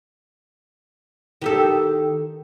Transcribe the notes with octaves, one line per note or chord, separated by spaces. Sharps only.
D#3 G4 A4